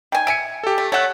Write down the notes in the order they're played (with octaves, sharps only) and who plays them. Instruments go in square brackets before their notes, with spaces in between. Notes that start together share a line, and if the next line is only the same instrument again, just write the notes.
[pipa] D#3 G#5 [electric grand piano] G5
[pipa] E5 G#5 [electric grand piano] C#7 D7
[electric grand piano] G4 A4
[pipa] A3
[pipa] A3 A4 [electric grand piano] C#5 F#5 F#6